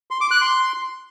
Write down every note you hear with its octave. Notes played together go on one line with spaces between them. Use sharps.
C6
D6
F#6
C6